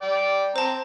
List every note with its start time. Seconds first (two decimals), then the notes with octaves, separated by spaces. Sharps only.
0.02 D5 G5
0.56 C4 C5 A5 A#5